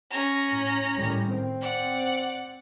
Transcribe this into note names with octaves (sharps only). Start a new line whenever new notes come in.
C#4 A#5
A2
A2 D#3 G3
C4
D5 F#5